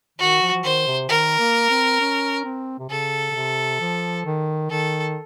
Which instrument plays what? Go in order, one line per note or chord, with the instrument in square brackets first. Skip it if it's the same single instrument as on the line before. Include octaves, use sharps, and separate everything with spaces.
[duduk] D#3 [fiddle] F#4
[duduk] F3
F3
[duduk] D#3 [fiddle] C5
[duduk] C3
[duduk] D#3 [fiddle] A#4
[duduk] A#3
C4
C#4
C4
C3
[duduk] C#3 [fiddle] A4
[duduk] C#3
C3
F3
D#3
[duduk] D#3 [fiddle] A4